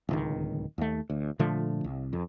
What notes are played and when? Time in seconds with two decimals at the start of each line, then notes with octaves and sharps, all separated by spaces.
0.09 D1 C#2 D#3
0.78 D#2 A3
1.10 D2
1.39 A#2 D3 F3 A3
1.84 C2
2.13 F2